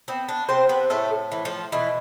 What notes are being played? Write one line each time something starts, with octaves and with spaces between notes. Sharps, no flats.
B3 C4
D4
C3 C4 C5
B3 B4
A2 A3 A4
E3
F3 F4
B2 E3 E4